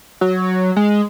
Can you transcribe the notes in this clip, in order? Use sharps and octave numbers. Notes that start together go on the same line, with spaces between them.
F#3
G#3